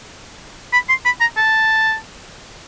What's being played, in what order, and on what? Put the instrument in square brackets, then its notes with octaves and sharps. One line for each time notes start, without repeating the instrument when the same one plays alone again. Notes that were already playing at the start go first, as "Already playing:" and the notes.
[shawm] B5
C6
B5
A#5
A5